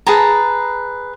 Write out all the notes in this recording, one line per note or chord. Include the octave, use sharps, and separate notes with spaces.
G#4 B4 A5 A#5